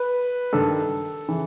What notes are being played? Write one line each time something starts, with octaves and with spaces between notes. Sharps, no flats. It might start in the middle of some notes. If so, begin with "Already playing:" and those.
Already playing: B4
G2 D#3 A4
C#3 E3